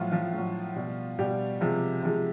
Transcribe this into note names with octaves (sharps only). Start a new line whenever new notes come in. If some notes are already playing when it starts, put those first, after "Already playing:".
Already playing: A2 F3 F#3 F4
F3 F4
A2 F#3
B2 G3
B2 G3 G4
C3 F3 G#3
C3 F3 G#3